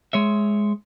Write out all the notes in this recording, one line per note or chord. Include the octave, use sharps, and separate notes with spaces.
G#3 C#5 E5